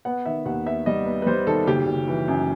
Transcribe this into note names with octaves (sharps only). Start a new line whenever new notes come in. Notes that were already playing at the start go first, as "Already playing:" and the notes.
B3 F#5
D#3 E5
D#2 F#5
B3 E5
G3 D#5
B3
B4
G3 C5
D#3 A4
F#1 G4
F#1
E3
F#2